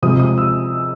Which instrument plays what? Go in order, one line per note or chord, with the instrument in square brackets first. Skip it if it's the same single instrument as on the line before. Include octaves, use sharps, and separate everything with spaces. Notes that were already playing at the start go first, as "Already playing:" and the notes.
[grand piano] C3 F3 G#3 D#6
D#6
E6